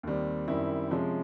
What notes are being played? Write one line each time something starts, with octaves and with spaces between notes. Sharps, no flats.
D#2 D#3 G3 C4
F#2 D#3 G3 C4 E4
C3 F3 G#3 C#4